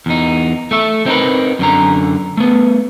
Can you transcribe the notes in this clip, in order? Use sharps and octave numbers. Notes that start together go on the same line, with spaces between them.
E2 D#4
A3 A4 E5
C4 D#4 A#4 B4
F#2 D3 A#5
A3 B3